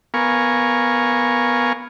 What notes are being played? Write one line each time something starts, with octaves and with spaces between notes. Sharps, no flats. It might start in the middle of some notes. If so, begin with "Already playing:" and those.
B3 A#4 F5 G#5 C#6